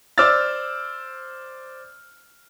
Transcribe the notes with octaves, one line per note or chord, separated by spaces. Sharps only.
C5 D5 D6 E6 F6 A6